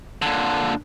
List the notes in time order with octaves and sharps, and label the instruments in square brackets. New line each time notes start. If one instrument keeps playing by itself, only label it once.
[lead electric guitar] A#2 D3